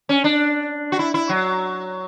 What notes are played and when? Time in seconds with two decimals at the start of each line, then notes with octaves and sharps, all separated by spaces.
0.09 C#4
0.24 D4
0.92 F#4
0.99 E4
1.14 E4
1.29 F#3